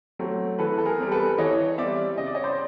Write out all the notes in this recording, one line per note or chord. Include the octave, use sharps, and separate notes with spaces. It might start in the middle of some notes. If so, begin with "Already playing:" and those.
F#3 A3 C4
E3 A4 B4
A4
G#4 A#4
G3 C4
A4 B4
E3 C#5 D#5
G3 C4 D5 E5
C#3 D#5
D5
C#5 D#5
C5 D5